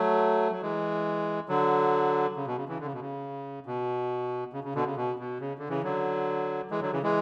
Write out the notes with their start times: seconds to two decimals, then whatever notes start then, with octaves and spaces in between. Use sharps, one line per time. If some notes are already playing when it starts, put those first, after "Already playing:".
Already playing: F#3 A3
0.52 F#3
0.62 E3 G#3
1.48 D3 F#3
2.36 C#3
2.47 B2
2.57 C#3
2.68 C#3 E3
2.80 D3
2.86 C#3
2.93 B2
3.00 C#3
3.66 B2
4.53 C#3
4.64 C#3
4.75 B2 D3
4.86 C#3
4.96 B2
5.19 B2
5.40 C#3
5.58 D3
5.69 C#3 E3
5.83 D3 F#3
6.70 E3 G#3
6.81 D3 F#3
6.92 C#3 E3
7.03 E3 G#3